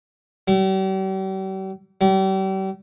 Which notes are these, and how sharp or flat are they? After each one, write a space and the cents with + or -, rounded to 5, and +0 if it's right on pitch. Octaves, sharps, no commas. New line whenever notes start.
G3 -45
G3 -40